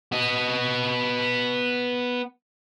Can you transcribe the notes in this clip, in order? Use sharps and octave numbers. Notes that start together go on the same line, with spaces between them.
B3 D#5